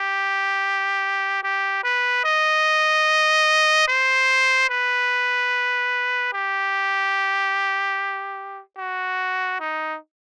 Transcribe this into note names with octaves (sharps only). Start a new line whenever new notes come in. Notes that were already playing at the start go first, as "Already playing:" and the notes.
Already playing: G4
G4
B4
D#5
C5
B4
G4
F#4
D#4